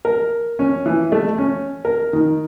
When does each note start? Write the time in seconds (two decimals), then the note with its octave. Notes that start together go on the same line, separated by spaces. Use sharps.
0.05 A#4
0.59 C#4
0.86 E3
1.12 A3
1.38 C#4
1.85 A#4
2.13 D#3